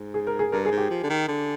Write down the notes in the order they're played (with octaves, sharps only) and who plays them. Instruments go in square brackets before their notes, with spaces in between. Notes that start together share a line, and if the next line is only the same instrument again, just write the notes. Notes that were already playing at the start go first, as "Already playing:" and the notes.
Already playing: [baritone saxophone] G#2
[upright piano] G#4
A#4
G#4
[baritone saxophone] G2 [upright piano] A#4
[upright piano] G#4
[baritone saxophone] G#2
[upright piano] G4
[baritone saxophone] F3
D3
D#3
D3